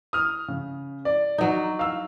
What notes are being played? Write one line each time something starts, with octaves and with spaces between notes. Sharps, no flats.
D#6 F6
C#3
D5
F#3 D#4
F5 E6